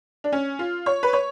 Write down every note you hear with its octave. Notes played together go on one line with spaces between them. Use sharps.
D4
C#4
F4
C#5
B4
C#5